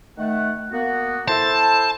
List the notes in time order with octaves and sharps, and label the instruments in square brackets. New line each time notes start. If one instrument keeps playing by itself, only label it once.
[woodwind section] D#3 A3 F#5
A#3 B3 F#4
[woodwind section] E4 A4 C5 [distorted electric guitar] A5